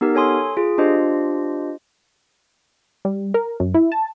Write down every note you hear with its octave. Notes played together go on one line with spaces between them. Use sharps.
B3 D#4 G4 A#4
A4 C#5 G#5 C6 D#6
F4 G#4
D4 F4 G4 C5 D#5
G3
A#4
F#2
E4
A5